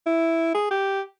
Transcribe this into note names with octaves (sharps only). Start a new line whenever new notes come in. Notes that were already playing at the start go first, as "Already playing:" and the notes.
E4
G#4
G4